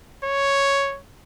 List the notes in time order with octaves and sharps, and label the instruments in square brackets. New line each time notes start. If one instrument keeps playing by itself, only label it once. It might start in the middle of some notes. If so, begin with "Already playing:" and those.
[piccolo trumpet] C#5